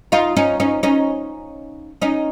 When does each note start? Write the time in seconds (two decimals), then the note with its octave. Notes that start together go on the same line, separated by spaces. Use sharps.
0.12 D#4 F4
0.36 C#4 D#4
0.60 C#4 D#4
0.83 C#4 D#4
2.02 C#4 D#4